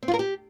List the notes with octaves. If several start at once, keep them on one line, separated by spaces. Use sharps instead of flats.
C4
F4
A#4
G4